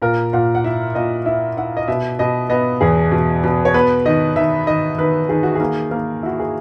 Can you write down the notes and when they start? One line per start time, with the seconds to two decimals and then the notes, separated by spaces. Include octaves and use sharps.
0.02 A#2 A#4
0.33 A#2 F#5
0.55 F#5
0.64 E4 E5
0.95 A#2 D#5
1.26 E4 E5
1.57 E4 F#5
1.77 D#5
1.88 B2 E5
2.19 B2 D#5
2.50 B3 D#5
2.81 E2 G#4
3.12 B2
3.44 B2
3.65 C#5
3.74 B3 B4
4.05 D#3 D#5
4.36 D#3 E5
4.67 D#3 D#5
4.98 D#3 B4
5.29 D#3 G#4
5.43 F#4
5.55 A#3 G#4
5.91 A#3
6.23 E4 F#4
6.40 G#4